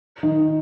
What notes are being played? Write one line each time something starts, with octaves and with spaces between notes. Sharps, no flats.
D#3 D#4